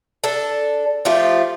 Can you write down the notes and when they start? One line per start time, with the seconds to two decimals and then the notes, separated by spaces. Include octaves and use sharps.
0.24 D4 A4
1.05 F3 A3 F4 G4